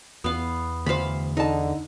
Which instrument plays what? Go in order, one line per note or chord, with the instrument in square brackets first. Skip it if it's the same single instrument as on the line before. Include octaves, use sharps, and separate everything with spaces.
[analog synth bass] E2 [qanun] B3 F5
[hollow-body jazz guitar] D2 C5 [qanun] F5 B5
[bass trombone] D3 [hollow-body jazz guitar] D#4 A5